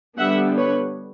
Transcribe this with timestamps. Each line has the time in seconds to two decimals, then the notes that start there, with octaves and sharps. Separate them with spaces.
0.18 D3 G3 B3 D4 E5 F#5
0.57 B4 C#5